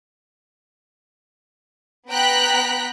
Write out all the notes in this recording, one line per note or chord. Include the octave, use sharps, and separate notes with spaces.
B3 G5 A#5 F#6 B6